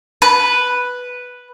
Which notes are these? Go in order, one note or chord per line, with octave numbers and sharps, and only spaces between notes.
B4